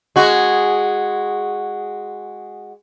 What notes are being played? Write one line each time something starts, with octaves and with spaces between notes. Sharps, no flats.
G#3 F#4